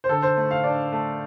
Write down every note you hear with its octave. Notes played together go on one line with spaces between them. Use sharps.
C5
D3 A4
C5
A3
F5
D4 D5
A3